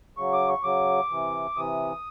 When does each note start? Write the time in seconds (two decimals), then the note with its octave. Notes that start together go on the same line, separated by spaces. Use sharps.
0.17 C#3 F#3 C#6
0.33 D6
0.48 C#6
0.63 C#3 F#3 D6
1.10 C3 E3
1.55 C3 E3 D#6